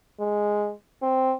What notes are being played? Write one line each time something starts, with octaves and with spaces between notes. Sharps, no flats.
G#3
C4